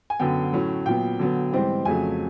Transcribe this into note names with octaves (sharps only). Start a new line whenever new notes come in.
G#5
F#2 D3 F#3 B3 G5
A2 F#3 A3 C#4
A#2 F#3 B3 G5
D3 F#3 B3
G#2 E3 G3 C4
F2 C#3 F#3 A3 G#5